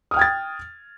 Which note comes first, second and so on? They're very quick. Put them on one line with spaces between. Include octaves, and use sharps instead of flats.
D#6 F6 G5 G#6 A6